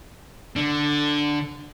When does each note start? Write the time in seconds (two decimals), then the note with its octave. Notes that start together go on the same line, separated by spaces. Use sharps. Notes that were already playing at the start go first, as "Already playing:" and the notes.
0.56 D3